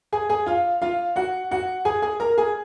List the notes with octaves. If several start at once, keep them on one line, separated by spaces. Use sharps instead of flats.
G#4 G#5
G#4 G#5
F4 F5
F4 F5
F#4 F#5
F#4 F#5
G#4 G#5
G#4 G#5
A#4 A#5
G#4 G#5